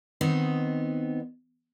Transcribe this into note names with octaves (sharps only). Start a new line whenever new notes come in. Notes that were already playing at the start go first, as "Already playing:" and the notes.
D#3 B3 C4 D#4